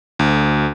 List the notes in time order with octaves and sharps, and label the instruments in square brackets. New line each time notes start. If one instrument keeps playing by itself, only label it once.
[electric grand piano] D2